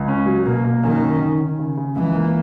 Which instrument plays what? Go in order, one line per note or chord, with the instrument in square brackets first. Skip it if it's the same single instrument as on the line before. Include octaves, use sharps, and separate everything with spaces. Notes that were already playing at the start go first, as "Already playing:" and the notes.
Already playing: [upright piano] C#2
C#4
F#3
[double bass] B2 [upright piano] A#3
[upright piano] A#3
[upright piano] F#2 [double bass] D#3
[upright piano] C#4
D#3
D#3
C#3
C#3
[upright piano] C#2 [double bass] E3
[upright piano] A#3